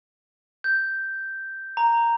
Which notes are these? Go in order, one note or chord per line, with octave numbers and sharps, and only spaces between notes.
G6
A#5